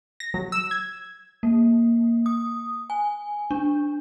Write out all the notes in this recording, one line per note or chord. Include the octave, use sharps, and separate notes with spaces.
A#6
F#3
E6
G#6
A#3
D#6
G#5
D4